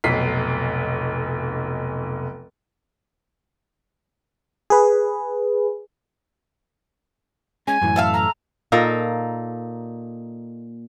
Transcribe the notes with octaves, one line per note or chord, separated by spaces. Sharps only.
F1 B1 B6 C7
G#4 B4
G#3 C#4 G#5
F#2 A2 E3
A4 E5 F5
A#5
A#2 A#3 D#4 A4